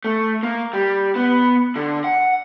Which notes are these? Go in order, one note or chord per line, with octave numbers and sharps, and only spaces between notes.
A3
A#3
G3
B3
D3
F#5